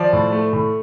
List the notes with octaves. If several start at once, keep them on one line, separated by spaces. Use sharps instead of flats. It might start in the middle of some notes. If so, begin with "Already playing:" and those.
Already playing: F3 D5
A2
A3
A2